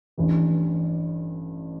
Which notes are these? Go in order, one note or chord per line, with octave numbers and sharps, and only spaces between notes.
A1 G2 E3